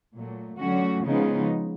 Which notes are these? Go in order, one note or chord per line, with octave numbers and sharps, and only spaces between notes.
A#2 F#3 A3
D3 F#3 A3 C#4 F#4
C#3 F3 G#3 B3 D#4